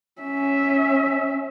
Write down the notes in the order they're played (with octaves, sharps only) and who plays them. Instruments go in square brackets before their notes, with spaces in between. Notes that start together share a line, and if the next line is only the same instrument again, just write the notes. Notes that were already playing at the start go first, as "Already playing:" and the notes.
[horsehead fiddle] C#4 E5